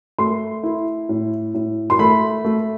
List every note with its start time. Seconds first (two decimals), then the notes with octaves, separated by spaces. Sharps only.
0.19 A3 C6
0.63 E4
1.09 A2
1.54 A2
1.90 C6
1.99 A3 B5
2.45 A3